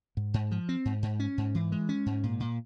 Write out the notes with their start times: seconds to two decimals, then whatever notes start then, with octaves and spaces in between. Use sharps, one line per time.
0.17 G#2
0.34 G#2
0.51 F3
0.69 C4
0.85 G#2
1.02 G#2
1.20 C#4
1.38 G#2
1.55 E3
1.72 G#3
1.89 C#4
2.06 G#2
2.23 A#2
2.40 A#2